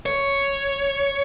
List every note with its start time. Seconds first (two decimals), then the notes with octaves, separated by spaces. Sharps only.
0.06 C#5